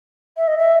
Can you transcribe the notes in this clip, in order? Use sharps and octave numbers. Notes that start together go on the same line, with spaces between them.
E5
D#5
E5